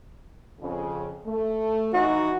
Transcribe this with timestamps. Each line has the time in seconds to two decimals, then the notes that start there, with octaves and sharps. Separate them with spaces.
0.60 F2 C#3
1.26 A3
1.94 E3 D#4 F#4